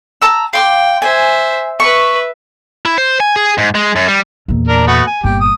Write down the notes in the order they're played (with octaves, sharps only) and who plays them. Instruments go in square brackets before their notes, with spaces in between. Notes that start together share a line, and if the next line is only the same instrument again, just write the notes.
[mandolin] A5 A#5 E6
[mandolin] F5 C6 D6 [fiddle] G5
[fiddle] C5 E5 [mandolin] G#5
[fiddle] B4 E5 [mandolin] C#6
[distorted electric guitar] E4
C5
G#5
G#4
G#2
G#3
F#2
G3
[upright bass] E2 A#2
[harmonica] D4 A#4
A3 B3 F#4
G#5
[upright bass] G1 A#2 [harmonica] G4
[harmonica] D#6